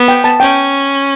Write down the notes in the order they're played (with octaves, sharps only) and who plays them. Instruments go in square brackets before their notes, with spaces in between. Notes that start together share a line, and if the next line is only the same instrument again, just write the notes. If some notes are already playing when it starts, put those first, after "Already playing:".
Already playing: [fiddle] B3
[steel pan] G5
A5
[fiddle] C#4 [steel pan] G5